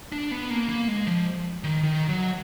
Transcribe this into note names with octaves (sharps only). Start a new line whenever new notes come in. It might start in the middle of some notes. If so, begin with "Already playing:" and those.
D4
B3
A#3
A#3
G#3
F3
D#3
D#3
F#3